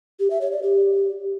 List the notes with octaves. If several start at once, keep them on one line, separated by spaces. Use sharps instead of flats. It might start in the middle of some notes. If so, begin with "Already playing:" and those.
G4
E5
C#5
D5
G4